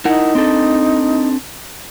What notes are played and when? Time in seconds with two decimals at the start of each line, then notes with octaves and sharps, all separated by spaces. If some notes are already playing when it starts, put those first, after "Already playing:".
0.05 D#4 E4 A#4 F#5
0.35 C4 D4 A4